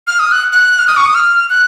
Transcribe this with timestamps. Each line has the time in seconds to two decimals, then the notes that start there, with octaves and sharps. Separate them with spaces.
0.07 F6
0.19 D#6
0.31 F#6
0.53 F#6
0.79 F6
0.87 D#6
0.97 C#6
1.06 D#6
1.14 F6
1.50 F#6